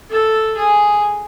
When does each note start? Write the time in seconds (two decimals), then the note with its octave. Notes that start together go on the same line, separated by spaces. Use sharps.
0.10 A4
0.57 G#4